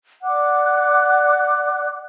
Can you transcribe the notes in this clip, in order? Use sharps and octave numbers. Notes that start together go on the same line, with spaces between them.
D5 F#5 D6 F#6